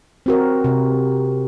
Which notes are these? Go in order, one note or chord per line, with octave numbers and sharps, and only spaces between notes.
C4 F#4 A#4
C3